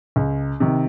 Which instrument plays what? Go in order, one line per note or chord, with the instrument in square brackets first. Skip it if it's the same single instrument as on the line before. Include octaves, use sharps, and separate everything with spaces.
[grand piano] C#2
C3 D#3